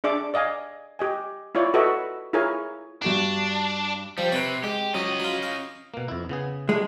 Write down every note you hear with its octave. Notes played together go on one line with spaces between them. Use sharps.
D4 G#4 D5 E5 D6
D5 D#5 F5 G#5
G4 D#5 G#5
E4 F4 C#5 D5
F#4 A4 B4 D#5 E5
E4 F4 G#4 A#4 C#5 G#5
G2 D4 F#4 E7
F3 G3
C3 B4 C#5
G#3 G4
F#3 C#4 D#5
F#3 F4
F5
B2 A#3
F2 E4
C#3 B3 G#4
G#3 A3 D4